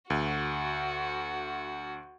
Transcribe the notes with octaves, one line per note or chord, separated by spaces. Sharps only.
D2 F#4